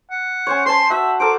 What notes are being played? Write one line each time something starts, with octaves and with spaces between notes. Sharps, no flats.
F#5
C#4 C5 C#5
C5 A5 C6
F#4 E5 F#5
A4 A#4 C5 D6